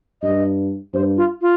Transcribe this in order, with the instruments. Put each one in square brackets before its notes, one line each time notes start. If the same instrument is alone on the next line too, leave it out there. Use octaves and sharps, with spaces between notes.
[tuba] G2 [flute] D#5
[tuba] G2 [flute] C5
[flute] F4
F4